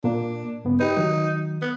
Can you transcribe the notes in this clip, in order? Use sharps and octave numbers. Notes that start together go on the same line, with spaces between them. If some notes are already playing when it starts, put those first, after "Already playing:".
A#2 A#3 D4
G2 C#3 B3
D#4 G4 B4
D#3 F#3
B3